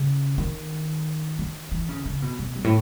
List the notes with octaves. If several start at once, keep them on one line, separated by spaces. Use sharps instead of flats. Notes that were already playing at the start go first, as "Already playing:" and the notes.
Already playing: C#3
D#3
D#3
E3
C#3
C#3
B2
B2
F#2
A2